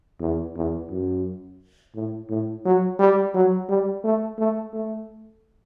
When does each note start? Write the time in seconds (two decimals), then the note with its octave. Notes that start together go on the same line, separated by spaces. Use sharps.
0.20 E2
0.56 E2
0.90 F#2
1.95 A2
2.30 A2
2.65 F#3
2.99 G3
3.35 F#3
3.69 G3
4.04 A3
4.39 A3
4.74 A3